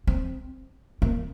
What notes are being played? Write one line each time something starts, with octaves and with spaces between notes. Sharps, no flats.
C4
A#3